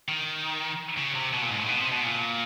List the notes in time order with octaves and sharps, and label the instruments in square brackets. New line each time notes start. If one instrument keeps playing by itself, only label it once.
[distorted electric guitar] D#3
C#3
C3
B2
A#2
G#2
A2
B2
C3
B2
A#2